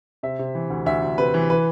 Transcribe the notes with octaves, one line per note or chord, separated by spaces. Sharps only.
C3 E5
C3
E3
D2
D2 E5
D2
C3 B4
E3
E3 B4